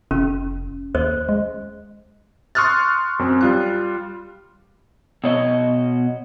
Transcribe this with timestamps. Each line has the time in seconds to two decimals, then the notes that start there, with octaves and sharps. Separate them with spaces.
0.11 F1 C#4
0.95 D#2 C5
1.29 G#3
2.55 C6 C#6 D#6 F6 F#6 A6
3.19 F#2 C4
3.41 G3 F4 F#6
5.24 B2 C#5 D#5